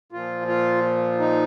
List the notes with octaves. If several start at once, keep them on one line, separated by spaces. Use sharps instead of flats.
A#2 F3 F4
F4
D#4